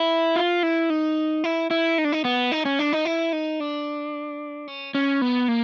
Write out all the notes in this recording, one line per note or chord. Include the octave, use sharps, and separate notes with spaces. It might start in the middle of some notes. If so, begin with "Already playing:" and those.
Already playing: E4
F4
E4
D#4
E4
E4
D#4
D4
D#4
B3
D#4
C#4
D4
D#4
E4
D#4
D4
C#4
C#4
B3
A#3